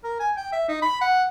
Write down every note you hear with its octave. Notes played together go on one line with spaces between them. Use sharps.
A#4
G#5
G5
E5
D#4
B5
F#5